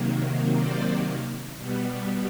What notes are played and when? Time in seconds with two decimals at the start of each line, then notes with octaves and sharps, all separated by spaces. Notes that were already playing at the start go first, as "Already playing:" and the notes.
Already playing: C3 D#3 F#3 A#3
0.57 C5 D5
1.57 B2 G3 B3